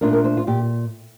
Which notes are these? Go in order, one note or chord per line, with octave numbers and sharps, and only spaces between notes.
A#2 A3 D4 F4 A#4
A#4
C5
F4
A#2 G4